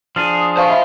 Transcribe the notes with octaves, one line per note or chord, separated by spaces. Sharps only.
F3 D4 G#4 F6
D#6
C5 F5 A5 C#6
D#5 E5 B5